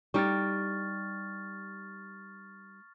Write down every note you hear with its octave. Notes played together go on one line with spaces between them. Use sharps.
G3 D#4 G4 C#6 F6 A6